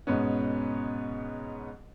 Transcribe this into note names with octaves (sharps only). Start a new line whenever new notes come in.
G#2 B2 B3 C#4